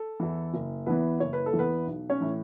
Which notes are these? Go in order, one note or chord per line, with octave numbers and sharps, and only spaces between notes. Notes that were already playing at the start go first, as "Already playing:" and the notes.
Already playing: A4
E2 E3
F#1
E2 E3 B3 B4
F#1 C#5
B4
A4
E2 E3
B3 B4
B1
C#4 C#5
A2 E3